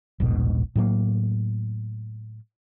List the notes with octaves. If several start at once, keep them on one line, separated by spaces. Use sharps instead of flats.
D#1 A#1 G#2 B2
A2 F#3 A#3